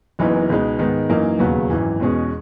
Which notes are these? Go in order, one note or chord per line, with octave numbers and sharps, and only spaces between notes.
F#1 F#2 E3 B3 D#4
C#2 B2 G#3 D#4
G#2 D#3 G#3 B3
F#2 E3 A#3 D#4
E1 D#2 C#3 F#3 B3
G#1 F#2 E3
E2 B2 G#3 C#4 G#4